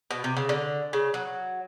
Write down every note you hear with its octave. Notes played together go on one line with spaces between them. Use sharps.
B2
C3
C#3
D3
C#3
F#3